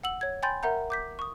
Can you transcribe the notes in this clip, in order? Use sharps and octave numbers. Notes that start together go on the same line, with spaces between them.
F#5 E6 F#7
C#5 G#6
G5 G#5 B5 C6 G6 A6
A#4 E5 F#5 A#5 G6
D6 G6 B6
C#6 D#6